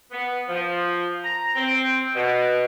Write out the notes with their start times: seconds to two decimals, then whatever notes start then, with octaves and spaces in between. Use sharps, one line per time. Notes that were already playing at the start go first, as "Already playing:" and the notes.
0.12 B3
0.49 F3
1.24 A#5
1.55 C4
2.15 B2